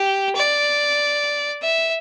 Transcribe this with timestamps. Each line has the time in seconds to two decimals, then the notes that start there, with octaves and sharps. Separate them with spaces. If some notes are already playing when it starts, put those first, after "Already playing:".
Already playing: G4
0.35 D5
1.62 E5